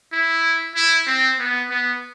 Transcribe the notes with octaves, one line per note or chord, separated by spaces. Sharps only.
E4
E4
C4
B3
B3